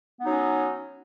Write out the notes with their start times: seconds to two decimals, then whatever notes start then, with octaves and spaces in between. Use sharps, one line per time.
0.19 B3
0.22 D#4
0.26 F#3
0.30 C#4